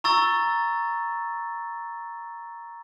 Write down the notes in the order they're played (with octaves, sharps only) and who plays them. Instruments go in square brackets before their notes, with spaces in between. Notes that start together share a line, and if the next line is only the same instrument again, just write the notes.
[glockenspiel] A#5 C#6 E6 A6